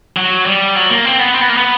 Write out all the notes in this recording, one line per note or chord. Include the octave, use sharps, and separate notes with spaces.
F#3
G3
F#3
A#3
C4
B3
C4
B3
A#3
B3